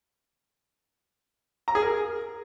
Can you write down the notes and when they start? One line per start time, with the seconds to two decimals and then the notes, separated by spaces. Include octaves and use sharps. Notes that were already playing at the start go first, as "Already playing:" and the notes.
1.68 A#5
1.75 G#4
1.82 A#4